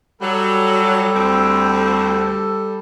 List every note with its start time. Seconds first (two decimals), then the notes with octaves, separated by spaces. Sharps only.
0.22 F#3 G3 A4
1.15 D2 C4